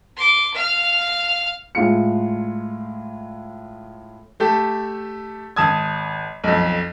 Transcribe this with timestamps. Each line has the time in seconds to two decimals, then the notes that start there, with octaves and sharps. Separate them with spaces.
0.17 C6 D6
0.54 F5 F6
1.75 A2 G#3 F4 C#7
4.40 A3 G4 A4
5.56 G#1 A5 D#6 G#6
6.44 B1 F2